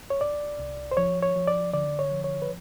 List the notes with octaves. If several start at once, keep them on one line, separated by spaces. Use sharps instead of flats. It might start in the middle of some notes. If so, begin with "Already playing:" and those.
C#5
C2 D5
C2
C5
F3 C#5
C#5
F3
D5
D3 D5
C#5
F3
C#5
B4